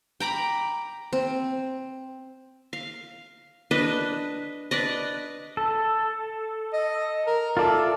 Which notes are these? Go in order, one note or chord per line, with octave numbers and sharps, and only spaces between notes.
G5 A#5 B5 D6
C4
F5
D4 B4 D#5
D4 B4 D5 D#5
A4
D#5
A#4
F4 A4 D5 E5